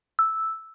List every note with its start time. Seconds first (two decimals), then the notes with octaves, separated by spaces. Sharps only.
0.19 E6